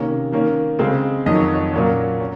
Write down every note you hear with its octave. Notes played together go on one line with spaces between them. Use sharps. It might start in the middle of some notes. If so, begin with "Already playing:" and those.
Already playing: C3 D#3 A#3 C#4
D#3 A#3 C#4
C#3 G#3 C4 F5
F2 D#3 F#3 D#5
C#5
C#5
A#2 F#3 A#3 C#4 C#5
C#4